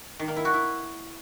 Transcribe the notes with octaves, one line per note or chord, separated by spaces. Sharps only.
D#3
A#3
E4
F#4
E4